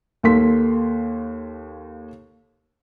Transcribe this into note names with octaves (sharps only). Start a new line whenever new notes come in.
D#2 A#3 A4 C6 B6